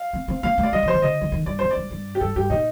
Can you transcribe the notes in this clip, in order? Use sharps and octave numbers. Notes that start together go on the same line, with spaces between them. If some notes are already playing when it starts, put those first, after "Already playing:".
Already playing: F5
C4
C4
A#3 F5
A3
D5
G3 D#5
F3
C5
D#3
D3 D#5
F3
D#3
G2 D5
F2 C5
D5
G2
G2
G4
G2 A4
G2 G4
A#2 D#4